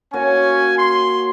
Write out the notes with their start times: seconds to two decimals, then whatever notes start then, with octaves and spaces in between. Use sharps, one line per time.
0.13 A#3 C#4 F#4 C#5 G#5
0.78 C6